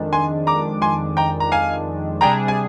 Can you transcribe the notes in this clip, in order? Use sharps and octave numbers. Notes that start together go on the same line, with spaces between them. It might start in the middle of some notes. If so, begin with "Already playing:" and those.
Already playing: F2 D#3 G#3 D4
G#5 C6
A#5 D6
G#5 C6
G5 A#5
A#5
F5 G#5
C3 G3 D4 G#4 G5 A#5
G#5